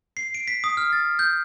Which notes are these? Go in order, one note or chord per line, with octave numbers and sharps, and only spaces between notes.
C7
D7
B6
D#6
F6
A6
G6